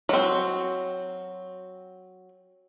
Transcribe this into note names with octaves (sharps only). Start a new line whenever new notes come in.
F#3 C4